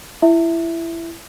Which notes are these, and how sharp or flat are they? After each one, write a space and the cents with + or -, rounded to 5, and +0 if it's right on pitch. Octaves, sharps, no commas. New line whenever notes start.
E4 +20 E5 +0